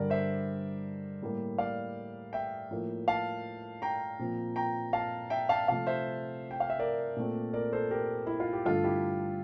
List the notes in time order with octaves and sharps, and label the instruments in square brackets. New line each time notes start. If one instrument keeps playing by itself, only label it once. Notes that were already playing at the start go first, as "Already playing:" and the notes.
Already playing: [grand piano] G2 D3 G3 A#4 D5
C5 E5
A2 G3 A#3
D5 F5
E5 G5
A2 F3 A#3
F5 A5
G5 A#5
A#2 F3 C4
G5 A#5
F5 A5
E5 G5
F5 A5
C3 F3 A3 F5 A5
C5 E5
G5
F5
E5
A#4 D5
A#2 A3 C4
A#4 D5
A4 C5
G4 A#4
E4
F4
G4
G2 D3 A3 F4 A4
E4 G4